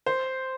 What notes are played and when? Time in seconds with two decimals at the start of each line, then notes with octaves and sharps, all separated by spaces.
0.06 C5